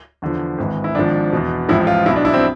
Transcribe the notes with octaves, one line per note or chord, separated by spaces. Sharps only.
E2 D3 F3
G#1 G#2 E3
E4
G#1 G#2 F3 D4
E2 B2
A1 G#2 F3 E4
F4
B1 B2 E4
D4
E4
C4